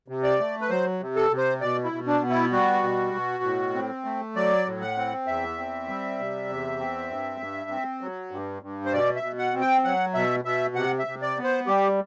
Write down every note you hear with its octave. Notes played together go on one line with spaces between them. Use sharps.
C3
D5
A3
B4
F#3 C5
C3
A4
C3
C5
B2 D5
E4
B2
D4
B3
E4
G3 F#4
B2
B2
A2
C4
A3
F#3 D5
A2
F#5
C4
E2 E5
C4
G3
C3
E2
C4
G2
G2
C4
F#3
G2
G2
C5
B2 D5
E5
B2
F#5
C4
G5
F#3 F#5
B2 E5
B2 E5
C3 F#5
E5
C3
D5
B3
C5
G3 G4